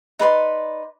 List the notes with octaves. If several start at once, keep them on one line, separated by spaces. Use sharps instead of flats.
D#4 B4 D5 C6